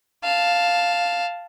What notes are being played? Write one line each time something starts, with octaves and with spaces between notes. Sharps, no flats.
F5 A5